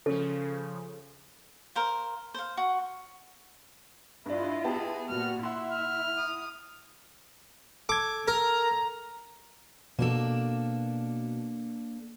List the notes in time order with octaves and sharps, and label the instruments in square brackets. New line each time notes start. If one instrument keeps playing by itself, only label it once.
[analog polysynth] C#3 F3 [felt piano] C#4 [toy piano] A4
[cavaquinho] A#4 C5 F5
C5 F5
F#4
[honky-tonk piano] G2 D4 [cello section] E4 F4 D#5
[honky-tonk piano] B3 G4 A5 [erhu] G#4
[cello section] A#2 F#4 [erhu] F6
[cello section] E4 [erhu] E5 [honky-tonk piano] F#5 C6
[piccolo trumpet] F6
[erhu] D#6
[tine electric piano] A4 G#6 [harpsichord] D6
[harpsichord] A#4 [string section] A#5
[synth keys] B2 [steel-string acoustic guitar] A#3 D4 A4